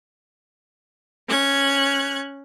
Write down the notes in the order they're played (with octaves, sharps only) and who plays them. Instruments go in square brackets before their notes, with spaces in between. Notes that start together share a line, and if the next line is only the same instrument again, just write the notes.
[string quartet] C#4 F#6 G#6